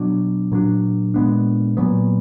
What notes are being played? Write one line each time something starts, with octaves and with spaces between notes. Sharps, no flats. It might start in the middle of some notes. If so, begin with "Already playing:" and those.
Already playing: B2 F#3 D4
A#2 F#3 D4
A#2 G#3 B3 D4
A#2 F#3 B3